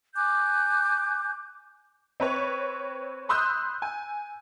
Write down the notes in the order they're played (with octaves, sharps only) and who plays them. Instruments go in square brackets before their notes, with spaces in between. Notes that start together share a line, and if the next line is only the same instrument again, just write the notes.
[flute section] G#5 D6 F#6 G6
[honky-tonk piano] C4 B4 C#5
B5 C6 D#6 E6 F#6 G6
G#5